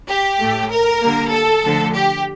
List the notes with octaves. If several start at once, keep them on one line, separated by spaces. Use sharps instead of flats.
G4
A2 A3
A#4
D3 G3 A#3
A4
D3 F3 A3
G4